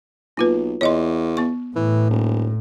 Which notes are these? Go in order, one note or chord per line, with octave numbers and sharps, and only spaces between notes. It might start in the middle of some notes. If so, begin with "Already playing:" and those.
B1 A#3 F4 B4
E2 C#5 D#5 C6
B3 C#6
A2 E3
D#1